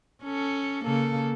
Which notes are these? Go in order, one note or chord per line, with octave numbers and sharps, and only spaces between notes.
C#4 A4
C#3 A#3 A4